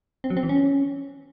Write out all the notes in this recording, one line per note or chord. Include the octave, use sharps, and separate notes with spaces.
C4
F#3
C4
E3
C#4